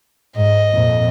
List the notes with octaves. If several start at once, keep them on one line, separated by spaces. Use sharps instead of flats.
G#2 D#5
F2 A#2